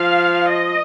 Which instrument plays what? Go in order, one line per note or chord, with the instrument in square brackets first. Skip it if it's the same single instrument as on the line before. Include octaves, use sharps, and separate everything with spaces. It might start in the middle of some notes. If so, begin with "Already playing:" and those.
Already playing: [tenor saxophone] F3 [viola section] F5
[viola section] D#5